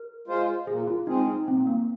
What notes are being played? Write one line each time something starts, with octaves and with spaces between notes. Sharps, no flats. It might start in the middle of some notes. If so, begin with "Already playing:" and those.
Already playing: A#4
G#3 F4 C5
A#2 G#4
F4
G#3 C4 D#4 G#4
D#4
A#2 C4
A#3